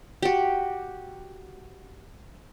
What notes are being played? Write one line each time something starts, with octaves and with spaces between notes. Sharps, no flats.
F#4 G4